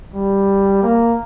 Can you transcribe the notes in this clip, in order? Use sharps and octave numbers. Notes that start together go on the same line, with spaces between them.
G3
A#3